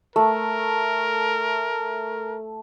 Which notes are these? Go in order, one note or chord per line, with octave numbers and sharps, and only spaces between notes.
A3 A#4